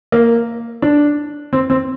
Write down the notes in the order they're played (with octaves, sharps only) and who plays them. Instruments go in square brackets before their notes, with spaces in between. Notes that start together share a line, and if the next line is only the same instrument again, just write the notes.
[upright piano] A#3
D4
C4
C4